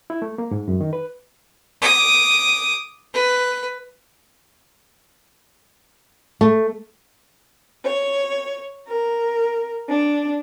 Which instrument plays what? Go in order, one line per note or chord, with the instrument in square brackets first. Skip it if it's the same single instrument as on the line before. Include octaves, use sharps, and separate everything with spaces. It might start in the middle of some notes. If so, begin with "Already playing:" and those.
[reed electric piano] E4
A3
A#3
G#2
F#2
D#3
B4
[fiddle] D6 D#6
B4
[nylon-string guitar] A3
[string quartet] C#5
A#4
D4